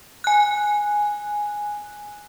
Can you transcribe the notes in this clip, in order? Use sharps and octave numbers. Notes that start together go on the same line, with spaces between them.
G#5 F#6